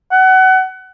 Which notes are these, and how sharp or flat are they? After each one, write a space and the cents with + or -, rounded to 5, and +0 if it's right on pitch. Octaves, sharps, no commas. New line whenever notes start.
F#5 +25